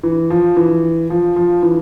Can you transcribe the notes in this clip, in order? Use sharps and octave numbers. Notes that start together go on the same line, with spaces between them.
E3
F3
E3
F3
F3
E3